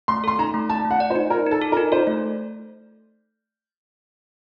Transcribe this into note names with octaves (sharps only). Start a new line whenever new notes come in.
A3 C6
A4 C6
D#4 A#5
A3
D5 A5
A3
F#5
D5
C5
D#4
D#4 A#4
D#4 A4
A4
A#4
D#4
A4 C5
A3